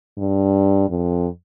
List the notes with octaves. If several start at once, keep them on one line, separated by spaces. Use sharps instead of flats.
G2
F2